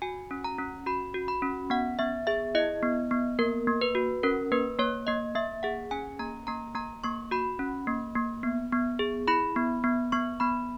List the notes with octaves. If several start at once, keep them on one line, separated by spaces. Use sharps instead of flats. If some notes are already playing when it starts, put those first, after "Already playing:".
F#4 G#5
C#4
A#5
C#4
F#4 B5
F#4
B5
C#4
B3 F#5
B3 E5
G#4 E5
E4 D#5
B3
B3
A#3 A#4
A#3
B4
F#4
C#4 A#4
A#3 B4
A#3 C#5
A#3 D#5
A#3 E5
G#4 F#5
C#4 G#5
A#3 A#5
A#3 A#5
A#3 A#5
A#3 C#6
F#4 B5
C#4
A#3
A#3
B3
B3
G#4
E4 B5
B3
B3
B3 C#6
B3 B5